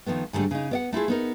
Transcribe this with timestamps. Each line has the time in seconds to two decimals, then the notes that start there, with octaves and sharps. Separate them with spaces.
0.06 D#3 F3 A3 B3
0.33 G#2 D3 F3 G3 A3
0.51 C#3 D#4
0.71 B3 D5 F#5
0.93 A3 E4 F4 G#4
1.08 B3 D#4 A#4